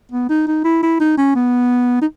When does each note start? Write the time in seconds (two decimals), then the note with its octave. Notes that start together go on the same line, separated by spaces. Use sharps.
0.11 B3
0.29 D#4
0.47 D#4
0.64 E4
0.83 E4
1.00 D#4
1.17 C#4
1.35 B3
2.01 D#4